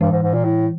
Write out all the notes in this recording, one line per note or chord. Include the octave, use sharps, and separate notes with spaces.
G2 E3
G#2
G#2
A#2
A2